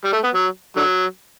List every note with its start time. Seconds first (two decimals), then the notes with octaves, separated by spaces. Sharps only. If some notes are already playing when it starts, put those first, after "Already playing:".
0.04 G3
0.13 A3
0.24 B3
0.34 F#3
0.76 D3 F#3